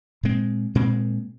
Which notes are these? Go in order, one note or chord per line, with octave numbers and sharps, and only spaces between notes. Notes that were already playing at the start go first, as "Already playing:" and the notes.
A#2 G#3 C4
A#2 G#3 C4